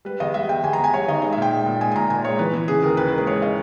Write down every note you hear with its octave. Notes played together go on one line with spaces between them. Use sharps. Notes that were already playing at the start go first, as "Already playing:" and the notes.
G3 B4
E2 D#5
G3 E5
E2 G5
E2 G#5
A#5
E2
G#5
G3 C#5
D#3 D#5
G#3 D#5
E5
A#2 G5
G#3
A#2
G#3 G#5
G#5
A#2 A#5
A#2 G#5
G#3 C#5
E3 B4
E3
C#3 G#4
D#2 A#4
D#2 B4
A#4
G#3
B4
G#3 C#5
D#5